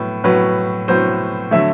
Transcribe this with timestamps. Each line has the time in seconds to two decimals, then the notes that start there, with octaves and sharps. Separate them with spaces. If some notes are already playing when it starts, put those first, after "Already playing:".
Already playing: A2 F#3 B3
0.24 A2 F#3 B3 B4
0.88 A2 F#3 B3 C5
1.51 D3 F#3 A3 E5